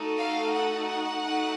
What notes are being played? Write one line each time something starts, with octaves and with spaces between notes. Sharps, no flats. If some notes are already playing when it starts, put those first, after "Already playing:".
Already playing: A3 D#4 F#4 A4
F5
F#5
A3 D#4 F#4